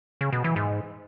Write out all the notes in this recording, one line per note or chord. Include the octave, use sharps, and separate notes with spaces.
C#3
B2
E3
G#2